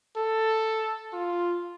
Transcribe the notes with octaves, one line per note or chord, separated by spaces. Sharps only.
A4
F4